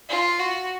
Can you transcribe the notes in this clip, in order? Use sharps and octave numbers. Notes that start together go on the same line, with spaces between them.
F4
F#4